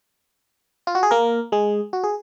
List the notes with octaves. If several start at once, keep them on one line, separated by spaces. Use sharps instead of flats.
F4
F#4
G#4
A#3 A#4
G#3 G#4
F#4
G#4